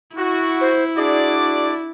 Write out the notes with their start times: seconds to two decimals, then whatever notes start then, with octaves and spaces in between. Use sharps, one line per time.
0.17 E4 F#4
0.61 C5
0.97 D4 F#4 G#4 D5